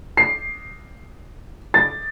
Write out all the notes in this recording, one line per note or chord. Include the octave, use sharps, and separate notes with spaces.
C7
A6